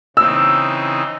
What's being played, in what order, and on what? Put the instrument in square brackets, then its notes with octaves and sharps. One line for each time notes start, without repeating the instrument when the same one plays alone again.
[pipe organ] C#3 E3 C4 D#4 [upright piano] E6